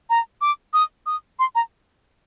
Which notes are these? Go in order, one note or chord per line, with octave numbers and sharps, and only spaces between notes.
A#5
D6
D#6
D#6
C6
A#5